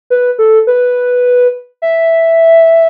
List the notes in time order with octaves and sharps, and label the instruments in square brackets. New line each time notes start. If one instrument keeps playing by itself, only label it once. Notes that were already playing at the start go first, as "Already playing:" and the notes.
[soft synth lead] B4
A4
B4
E5